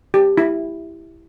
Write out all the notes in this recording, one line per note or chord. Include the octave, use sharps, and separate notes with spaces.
G4
E4